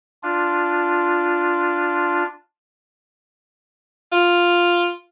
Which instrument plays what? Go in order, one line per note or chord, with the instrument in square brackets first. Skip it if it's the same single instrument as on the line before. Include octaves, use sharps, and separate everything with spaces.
[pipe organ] D4 F4
[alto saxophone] F4